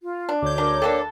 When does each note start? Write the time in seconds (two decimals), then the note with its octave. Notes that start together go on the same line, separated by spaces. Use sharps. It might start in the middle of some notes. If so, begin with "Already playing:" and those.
0.03 F4
0.29 D4
0.42 D2 C#5 D6 G6
0.58 C#3 D4 A#4
0.82 G3 A#3 D4 A4